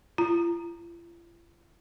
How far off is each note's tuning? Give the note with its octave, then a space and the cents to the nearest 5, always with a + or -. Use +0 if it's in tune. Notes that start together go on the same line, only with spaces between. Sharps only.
F4 -45 A#5 +0